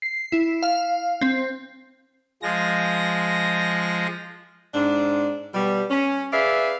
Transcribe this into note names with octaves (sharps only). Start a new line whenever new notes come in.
C7
E4
F5
C4
F3 G#3 A#6
G#2 C4 D4
B2 G3
C#4
G#4 B4 D5 E5 F5